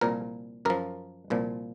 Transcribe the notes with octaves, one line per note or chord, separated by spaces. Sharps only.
C2 A#2 F3 A#4
F#2 F3 A#4
C2 A#2 F3